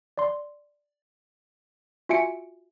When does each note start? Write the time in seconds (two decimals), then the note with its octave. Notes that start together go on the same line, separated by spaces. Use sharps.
0.18 D5 C6
2.09 F4 F#4 E5 G#5 C#7 D7